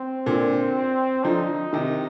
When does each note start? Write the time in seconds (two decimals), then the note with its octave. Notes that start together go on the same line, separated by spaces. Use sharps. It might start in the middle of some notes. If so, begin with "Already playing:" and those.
Already playing: C4
0.26 A#2 D3
1.24 D3 F3 D#4
1.73 C3 D#3